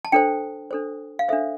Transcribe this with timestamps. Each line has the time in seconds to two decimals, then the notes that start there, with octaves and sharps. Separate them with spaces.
0.05 A5
0.12 D4 A4 C5 G5
0.71 D4 A4 C5
1.19 F5
1.29 D4 A4 C5 E5